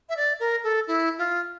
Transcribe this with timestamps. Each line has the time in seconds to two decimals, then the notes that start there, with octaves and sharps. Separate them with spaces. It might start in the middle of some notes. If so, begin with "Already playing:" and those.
0.09 E5
0.17 D5
0.40 A#4
0.64 A4
0.87 E4
1.18 F4